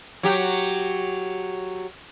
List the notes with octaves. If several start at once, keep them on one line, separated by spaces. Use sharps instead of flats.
F#3 G4